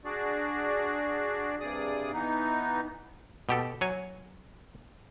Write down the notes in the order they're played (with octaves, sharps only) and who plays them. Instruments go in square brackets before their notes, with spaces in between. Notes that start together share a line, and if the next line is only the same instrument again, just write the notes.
[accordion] D4 F#4 G#4 D5
G2 C3 G#4 D5 D#6
E3 B3 D#4
[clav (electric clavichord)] B2 G4 A4
F#3 C#5 G#5